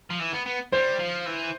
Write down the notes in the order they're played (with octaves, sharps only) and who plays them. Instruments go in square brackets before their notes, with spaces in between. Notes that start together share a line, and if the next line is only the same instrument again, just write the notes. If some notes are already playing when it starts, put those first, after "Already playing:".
[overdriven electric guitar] F3
E3
B3
B3
[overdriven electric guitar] G3 [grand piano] C5
[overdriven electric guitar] F3
E3